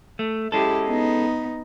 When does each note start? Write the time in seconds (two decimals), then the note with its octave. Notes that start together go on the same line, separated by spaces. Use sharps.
0.19 A3
0.52 G#3 C#4 E4 G4 A4
0.87 B3 D#4